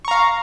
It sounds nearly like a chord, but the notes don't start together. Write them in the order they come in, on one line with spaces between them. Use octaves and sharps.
C#6 A#5 F5